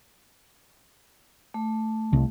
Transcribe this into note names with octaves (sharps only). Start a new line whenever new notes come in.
A3
C2